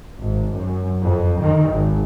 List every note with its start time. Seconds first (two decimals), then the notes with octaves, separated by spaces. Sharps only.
0.21 G#1
0.55 F#2
1.02 F2
1.41 D#3
1.71 G#1